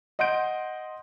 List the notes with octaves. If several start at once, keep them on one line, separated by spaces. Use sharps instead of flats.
D#5 F#5 C6 G6 D7